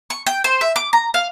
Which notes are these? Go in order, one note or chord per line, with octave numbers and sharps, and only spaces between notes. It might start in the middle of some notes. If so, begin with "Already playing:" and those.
C#6
G5
C5
E5
D6
A#5
F5